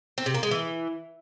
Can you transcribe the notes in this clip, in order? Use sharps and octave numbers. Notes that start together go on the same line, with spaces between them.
C4
C3
A#3
G#3
E3